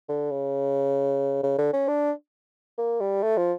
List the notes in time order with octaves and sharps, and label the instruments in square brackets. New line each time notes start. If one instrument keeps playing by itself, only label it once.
[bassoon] D3
C#3
C#3
D3
C#4
D4
A#3
G3
A3
F3